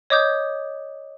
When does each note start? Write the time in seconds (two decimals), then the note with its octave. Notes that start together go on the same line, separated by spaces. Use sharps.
0.10 C#5 D#5 D6 D#6 G6